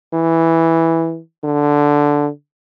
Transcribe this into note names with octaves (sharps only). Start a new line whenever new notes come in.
E3
D3